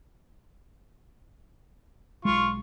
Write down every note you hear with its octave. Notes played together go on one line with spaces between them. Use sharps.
B1 G#3 F4 C#6